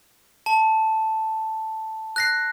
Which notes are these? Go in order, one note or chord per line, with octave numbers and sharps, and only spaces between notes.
A5
F#6 A#6 C7